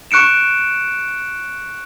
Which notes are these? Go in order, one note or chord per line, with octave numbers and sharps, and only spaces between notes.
C#6 F#6 C#7 D7 E7